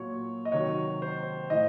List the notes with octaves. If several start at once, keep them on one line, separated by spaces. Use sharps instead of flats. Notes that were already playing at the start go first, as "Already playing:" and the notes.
Already playing: A#2 F#3 C#5
D#5
C3 D#3 F#3 C#5
C5
A2 F3 D#5